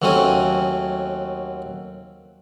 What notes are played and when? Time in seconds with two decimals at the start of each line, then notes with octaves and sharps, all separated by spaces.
0.02 D#2 F#3 A3 C4 C#4 G#5